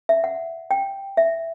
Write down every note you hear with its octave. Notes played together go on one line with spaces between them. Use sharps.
E5
F#5
G5
E5